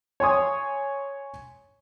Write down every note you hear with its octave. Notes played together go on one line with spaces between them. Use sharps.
C#5 G#5 C6 D#6